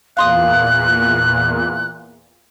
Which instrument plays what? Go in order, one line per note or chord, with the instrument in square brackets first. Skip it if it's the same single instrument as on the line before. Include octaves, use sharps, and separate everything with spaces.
[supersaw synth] E2 A#2 [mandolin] F5 C6 D#6 [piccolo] F#6